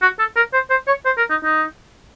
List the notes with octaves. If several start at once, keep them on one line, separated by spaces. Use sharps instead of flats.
F#4
A4
A#4
C5
C5
C#5
C5
A#4
D#4
D#4